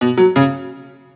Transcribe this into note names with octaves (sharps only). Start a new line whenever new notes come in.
B2
F#3
C#3